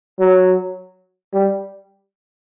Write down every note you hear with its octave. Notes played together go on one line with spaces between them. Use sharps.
F#3
G3